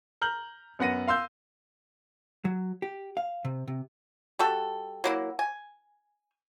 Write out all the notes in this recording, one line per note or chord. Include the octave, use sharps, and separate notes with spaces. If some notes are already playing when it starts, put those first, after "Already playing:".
A#5 F6 G6 F#7
F#2 B3 F#5 A#6 D#7
F5 C6 E6 G6
F#3
G4
F5
C3
C3
G3 F#4 A4
F#3 A#3 E4
G#5